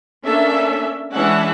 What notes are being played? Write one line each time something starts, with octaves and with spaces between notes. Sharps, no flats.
A#3 C#4 D4 A4 E5
E3 G#3 C#4 D4 E5 F#5